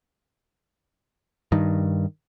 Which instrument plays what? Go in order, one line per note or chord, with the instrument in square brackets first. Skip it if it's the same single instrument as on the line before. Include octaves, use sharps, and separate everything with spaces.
[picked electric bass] G2 D#3